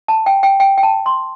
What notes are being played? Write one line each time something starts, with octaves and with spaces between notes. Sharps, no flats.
A5
G5
G5
G5
G5
A5
C6